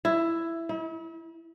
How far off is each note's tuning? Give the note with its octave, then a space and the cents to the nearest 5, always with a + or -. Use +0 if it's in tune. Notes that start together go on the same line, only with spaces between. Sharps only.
E4 +10
E4 -40